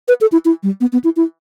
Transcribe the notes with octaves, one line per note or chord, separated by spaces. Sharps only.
B4
A4
E4
E4
G3
B3
B3
E4
E4